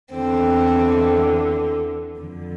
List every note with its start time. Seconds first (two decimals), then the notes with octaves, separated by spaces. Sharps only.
0.12 E2 D3 C4
2.20 F2 D3